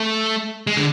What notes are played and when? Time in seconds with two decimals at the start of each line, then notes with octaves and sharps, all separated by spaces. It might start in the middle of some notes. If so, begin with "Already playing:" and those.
Already playing: A3
0.67 G#3
0.77 D3